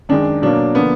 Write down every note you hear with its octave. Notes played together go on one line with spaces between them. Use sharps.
F#2 D#3 G#3 D4
B2 F#3 A#3 D4
D3 F3 A#3 B3